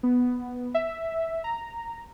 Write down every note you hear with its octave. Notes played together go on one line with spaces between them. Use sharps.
B3
E5
A#5